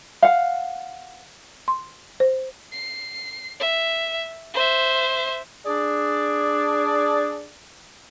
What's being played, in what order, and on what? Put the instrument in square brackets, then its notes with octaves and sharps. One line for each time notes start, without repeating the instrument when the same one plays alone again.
[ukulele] F5 F#5
[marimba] C6
C5
[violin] C7
E5
C5 E5
[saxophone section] D4 G#4 D5